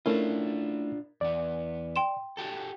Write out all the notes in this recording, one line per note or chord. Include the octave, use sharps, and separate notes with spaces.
A3 C#4 D4 E4 F4 A#4
E2 B3 D5
G5 C6 E7
F#4 G4 A4